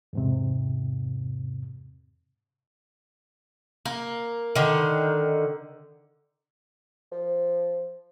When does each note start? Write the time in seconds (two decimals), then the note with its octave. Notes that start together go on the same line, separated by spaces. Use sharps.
0.13 E2 G#2 C3
3.85 A#3
4.56 D3 D#3
7.12 F3